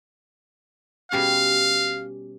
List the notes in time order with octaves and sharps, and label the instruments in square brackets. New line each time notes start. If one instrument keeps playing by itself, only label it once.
[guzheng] B2 G3 C#4 [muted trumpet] F5